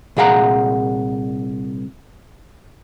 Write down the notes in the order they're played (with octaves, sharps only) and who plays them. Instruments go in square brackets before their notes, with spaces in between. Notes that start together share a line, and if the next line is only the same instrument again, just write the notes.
[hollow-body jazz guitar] C2 A#2 G#4 F5 F#5 A#5